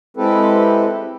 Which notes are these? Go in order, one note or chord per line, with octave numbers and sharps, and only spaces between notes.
G#3 C4 E4 G4 A4 B4